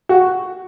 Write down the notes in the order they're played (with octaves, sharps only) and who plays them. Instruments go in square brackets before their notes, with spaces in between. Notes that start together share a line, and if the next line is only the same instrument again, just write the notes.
[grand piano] F#4